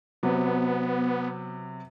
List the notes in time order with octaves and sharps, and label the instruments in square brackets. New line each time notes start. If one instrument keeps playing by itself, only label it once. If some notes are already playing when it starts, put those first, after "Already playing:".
[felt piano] C3 F#3 [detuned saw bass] B3